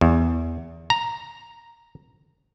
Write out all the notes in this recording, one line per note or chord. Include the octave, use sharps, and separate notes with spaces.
E2
A#5